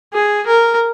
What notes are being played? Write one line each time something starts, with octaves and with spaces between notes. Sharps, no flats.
G#4
A#4